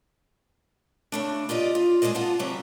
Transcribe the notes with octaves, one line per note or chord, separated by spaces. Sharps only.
C#3 A3 D4
F4 G4 D5 D#5
F4
G#3 G#4 C5 D5 D#5
F4 F5 F#5 A5
C3 F#3 G3 C4 C#4